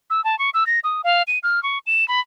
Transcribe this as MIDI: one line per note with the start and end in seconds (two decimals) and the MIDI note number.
0.10 0.23 88
0.24 0.38 81
0.39 0.50 85
0.54 0.66 88
0.66 0.80 94
0.84 1.02 87
1.04 1.22 77
1.27 1.39 99
1.43 1.62 89
1.63 1.78 85
1.87 2.07 100
2.08 2.20 83